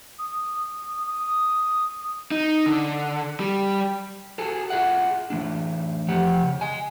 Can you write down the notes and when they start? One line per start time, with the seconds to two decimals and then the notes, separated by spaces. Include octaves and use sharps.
0.19 D#6
1.07 D#6
2.31 D#4
2.66 D3
3.40 G3
4.38 F#4 G#4 A4
4.70 F4 G#4 E5 F#5
5.30 E3 A3 D4
6.08 F2 F3 G4 F#5
6.43 C#3
6.61 D#5 G#5